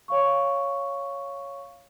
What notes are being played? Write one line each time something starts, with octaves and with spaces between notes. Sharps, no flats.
C#5 F5 C#6